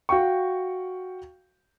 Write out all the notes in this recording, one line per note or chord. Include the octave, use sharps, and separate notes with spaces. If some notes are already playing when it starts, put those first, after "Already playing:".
F#4 F5 G5 C#6